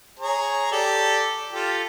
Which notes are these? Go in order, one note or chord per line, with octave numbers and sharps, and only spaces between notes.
G#4 C#5 A#5
G4 A4 D5
F4 G4 A4